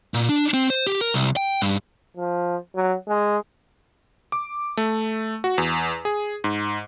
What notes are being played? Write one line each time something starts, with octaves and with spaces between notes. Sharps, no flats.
A#2
D4
C4
C5
G4
A#4
C2
G5
G2
F3
F#3
G#3
D6
A3
F#4
E2
G#4
G#2